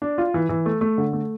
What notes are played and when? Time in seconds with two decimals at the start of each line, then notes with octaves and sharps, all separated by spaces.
0.02 D4
0.18 F4
0.34 E3
0.49 E3
0.66 A3
0.81 A3
0.98 D3
1.13 A3